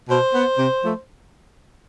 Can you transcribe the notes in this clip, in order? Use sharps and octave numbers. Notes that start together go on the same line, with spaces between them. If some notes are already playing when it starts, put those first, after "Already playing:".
B2 C5
B3
C3
F3 A3